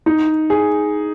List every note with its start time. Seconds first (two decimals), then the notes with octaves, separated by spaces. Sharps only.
0.06 D#4
0.50 G#4